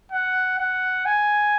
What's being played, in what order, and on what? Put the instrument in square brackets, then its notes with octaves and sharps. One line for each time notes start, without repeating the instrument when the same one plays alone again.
[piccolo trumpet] F#5
F#5
G#5